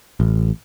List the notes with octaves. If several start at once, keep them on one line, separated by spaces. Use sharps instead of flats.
A1